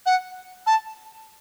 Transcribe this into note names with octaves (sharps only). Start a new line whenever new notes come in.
F#5
A5